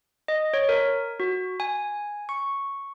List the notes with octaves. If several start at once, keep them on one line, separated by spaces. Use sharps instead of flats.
D#5
C#5
A#4
F#4
G#5
C#6